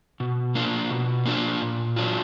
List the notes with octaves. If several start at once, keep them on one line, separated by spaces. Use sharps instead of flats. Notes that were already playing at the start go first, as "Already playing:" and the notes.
B2
A#3 D4 F4
B2
A#3 D4 F4
A#2
F#3 D4 F4